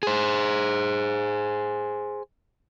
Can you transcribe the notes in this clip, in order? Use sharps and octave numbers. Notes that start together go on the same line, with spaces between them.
G#4 C5